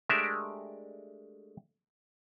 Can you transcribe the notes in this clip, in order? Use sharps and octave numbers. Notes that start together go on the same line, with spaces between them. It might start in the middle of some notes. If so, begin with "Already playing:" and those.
G#3 A3 D4 G4 A#4 E5